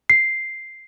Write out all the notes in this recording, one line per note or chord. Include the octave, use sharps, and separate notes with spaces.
C7